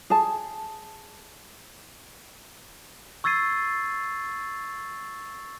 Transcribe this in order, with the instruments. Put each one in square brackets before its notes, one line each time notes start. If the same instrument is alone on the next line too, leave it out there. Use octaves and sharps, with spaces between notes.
[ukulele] G#4 A5
[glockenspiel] C#6 E6 G#6 A6 C7 D#7